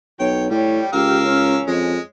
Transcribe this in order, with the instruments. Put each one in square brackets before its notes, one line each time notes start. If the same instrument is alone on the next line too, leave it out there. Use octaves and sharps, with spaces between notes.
[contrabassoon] B1 [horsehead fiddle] C#5 [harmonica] G5
[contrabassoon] A2 [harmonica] G3 [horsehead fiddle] C#5 G5
[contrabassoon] C#2 [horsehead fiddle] G4 [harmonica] A#4 F5 E6
[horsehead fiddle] C#4
[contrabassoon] F2 [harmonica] G#3